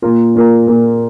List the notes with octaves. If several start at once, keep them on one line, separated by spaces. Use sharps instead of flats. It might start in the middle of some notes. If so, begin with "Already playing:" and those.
A#2 A#3 F4 A#4
A#2 A#3 F4 A#4
A#2 A#3 F4 A#4